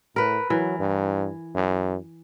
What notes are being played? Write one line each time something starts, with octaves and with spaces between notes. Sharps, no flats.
A2 A#4 B4
E3 F#3 A#4
G2
F#2